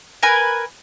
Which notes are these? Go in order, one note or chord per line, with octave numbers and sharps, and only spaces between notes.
A#4 B4 G#5